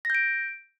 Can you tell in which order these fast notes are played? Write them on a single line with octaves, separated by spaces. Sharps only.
A#6 G6 D7